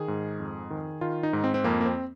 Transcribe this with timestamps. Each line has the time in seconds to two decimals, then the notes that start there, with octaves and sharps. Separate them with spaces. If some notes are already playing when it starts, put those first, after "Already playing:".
Already playing: D#3 G#4
0.08 G#2
0.40 F2
0.70 D#3
1.01 D#3 F4
1.23 D#4
1.33 G#2
1.44 C4
1.54 C4
1.64 F2 A#3
1.81 A#3
1.86 C4